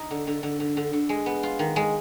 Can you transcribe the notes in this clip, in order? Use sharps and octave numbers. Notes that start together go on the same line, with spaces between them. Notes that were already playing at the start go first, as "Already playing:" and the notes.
Already playing: D#4
D3
D3
D3
D3
D3
D3
G#3
B3
F4
D#3
G#3